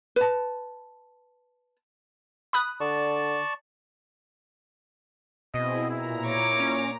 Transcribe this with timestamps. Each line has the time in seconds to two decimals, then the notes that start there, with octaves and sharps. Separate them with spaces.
0.16 B4 A5
2.53 B5 D#6 F#6
2.81 D3 D5 A5 C#6
5.54 B2 C4 E4 G#4 D#5
5.90 A#2 E4 A#5
6.24 C#5 D6
6.60 C#4